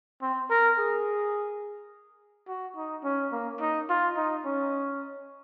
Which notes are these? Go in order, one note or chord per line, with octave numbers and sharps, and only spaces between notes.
C4
A#4
G#4
F#4
D#4
C#4
A#3
D#4
F4
D#4
C#4